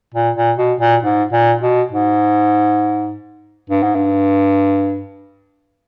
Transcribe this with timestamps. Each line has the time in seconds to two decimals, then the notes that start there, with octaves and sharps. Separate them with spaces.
0.14 A#2
0.36 A#2
0.58 B2
0.80 A#2
1.03 G#2
1.33 A#2
1.61 B2
1.92 G#2
3.70 G2
3.83 G#2
3.95 G2